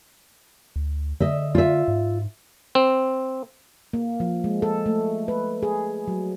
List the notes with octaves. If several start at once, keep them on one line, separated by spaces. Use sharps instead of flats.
D2
D3 D#5 E5
F4 E5
G#2
C4
A#3
F3
G#3
A4
A3
B4
G#4
F#3